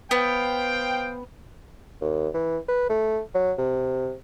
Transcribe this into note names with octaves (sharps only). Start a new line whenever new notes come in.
B3 C5 F5 G5
D#2
E3
B4
A3
F#3
C3